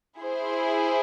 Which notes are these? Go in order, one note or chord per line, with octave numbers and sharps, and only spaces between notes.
E4 G#4 C5